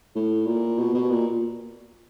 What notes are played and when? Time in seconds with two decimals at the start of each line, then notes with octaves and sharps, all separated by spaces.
0.16 A2
0.46 A#2
0.78 B2
0.94 B2
1.10 A#2